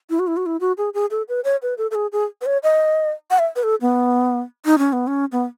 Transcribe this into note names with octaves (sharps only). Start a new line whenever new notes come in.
E4
F#4
E4
F#4
E4
F#4
G#4
G#4
A4
B4
C#5
B4
A4
A4
G#4
G#4
B4
C#5
D#5
F#5
E5
B4
A4
B3
D#4
C#4
B3
C#4
B3